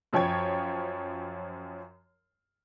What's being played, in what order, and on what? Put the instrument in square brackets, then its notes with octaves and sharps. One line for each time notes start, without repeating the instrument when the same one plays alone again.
[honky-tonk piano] F#2 F3 C#5 G5 G#6